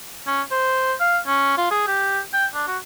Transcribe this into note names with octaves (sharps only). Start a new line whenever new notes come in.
C#4
C5
F5
C#4
F4
G#4
G4
G5
D4
F#4